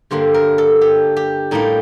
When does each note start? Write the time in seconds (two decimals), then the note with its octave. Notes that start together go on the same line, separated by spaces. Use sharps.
0.11 G2 D3 G3 A#3 C5
0.34 A#4
0.58 A4
0.81 G4
1.17 G4
1.51 A2 G3 A#3 D#4